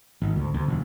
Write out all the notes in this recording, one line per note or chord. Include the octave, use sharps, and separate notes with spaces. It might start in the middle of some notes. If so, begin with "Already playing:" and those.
G#1
D2
D2
E1